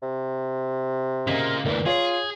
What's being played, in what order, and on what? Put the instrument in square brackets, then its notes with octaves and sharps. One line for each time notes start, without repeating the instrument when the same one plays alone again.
[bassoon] C3
[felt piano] C#3 D#5 B6 [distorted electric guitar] A#3 F4
[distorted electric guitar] D2 E3 [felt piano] A#4 B4 D5
[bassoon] F4 [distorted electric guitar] G#4 [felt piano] C#5